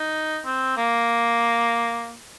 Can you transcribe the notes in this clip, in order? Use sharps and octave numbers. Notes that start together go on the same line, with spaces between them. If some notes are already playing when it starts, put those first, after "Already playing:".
Already playing: D#4
C4
A#3